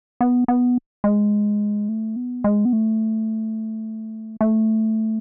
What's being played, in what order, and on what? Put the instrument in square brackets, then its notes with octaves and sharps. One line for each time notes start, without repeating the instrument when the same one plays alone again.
[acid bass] B3
B3
G#3
A3
B3
G#3
B3
A3
A3